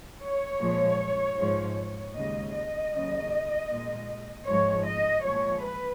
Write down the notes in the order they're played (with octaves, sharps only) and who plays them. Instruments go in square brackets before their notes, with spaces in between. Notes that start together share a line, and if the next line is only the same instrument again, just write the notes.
[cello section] C#5
A#2 F3 G#3
G#2 F3 G#3
D#2 C#3 G#3 D#5
D#5
D#2 C#3 F#3
A#2 G#3
G#2 F3 G#3 C#5
D#5
A#2 F3 G#3 C#5
B4